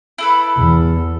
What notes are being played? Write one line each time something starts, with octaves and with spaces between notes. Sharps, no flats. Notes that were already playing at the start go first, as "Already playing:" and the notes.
E4 A4 B4
E2